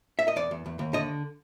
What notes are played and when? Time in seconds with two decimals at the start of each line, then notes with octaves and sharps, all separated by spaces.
0.19 E5
0.28 D#5
0.36 E2 D5
0.51 E2
0.66 E2
0.79 D#2
0.93 D3 D#5